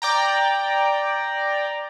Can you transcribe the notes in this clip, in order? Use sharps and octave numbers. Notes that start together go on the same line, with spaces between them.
D5 G5 A#5